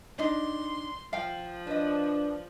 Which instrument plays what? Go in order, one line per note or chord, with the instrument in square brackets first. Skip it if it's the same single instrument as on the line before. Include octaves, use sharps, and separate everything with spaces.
[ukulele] D4 D#4 [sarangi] C6
[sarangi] F3 [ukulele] F5 G5
[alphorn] D4 [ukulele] B4 D#5